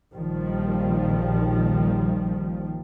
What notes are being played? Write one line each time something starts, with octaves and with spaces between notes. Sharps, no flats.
A#1 D#2 D#3 F3 G3